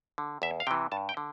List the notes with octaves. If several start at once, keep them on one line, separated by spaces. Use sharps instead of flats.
D3
E2 E5
F5
C3 E3 G5
G2 A5
G5
D3